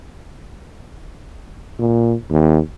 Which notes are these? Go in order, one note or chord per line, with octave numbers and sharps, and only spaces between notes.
A#2
D#2